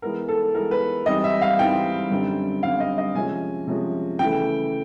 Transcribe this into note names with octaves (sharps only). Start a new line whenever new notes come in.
E3 G#3 B3 A#4
A4
E3 G#3 B3 A#4
B4
G#2 E3 G3 C4 E4 D#5
E5
F5
G#2 E3 G3 C4 E4 G5
F#2 D3 G3 C4
F#2 D3 G3 C4 F5
D#5
D#5
C3 F3 G#3 C#4 G#5
C3 F3 G#3 C#4
C#3 E3 A3 G5